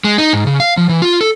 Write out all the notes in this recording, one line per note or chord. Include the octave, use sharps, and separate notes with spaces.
G#3
D#4
G#2
C#3
F5
F3
E3
F4
A4